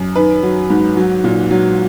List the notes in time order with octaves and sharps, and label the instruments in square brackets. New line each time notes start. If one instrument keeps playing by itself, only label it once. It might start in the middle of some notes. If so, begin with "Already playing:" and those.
Already playing: [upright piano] F#2
D#3 B4
F#3
G#2
F#3
A#2
F#3